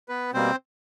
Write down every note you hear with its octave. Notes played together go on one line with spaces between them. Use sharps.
B3 B4
B2 G3 A#3 C4 C5